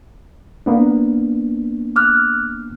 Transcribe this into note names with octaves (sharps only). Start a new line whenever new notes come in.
A#3 B3 D4
D6 F6 F#6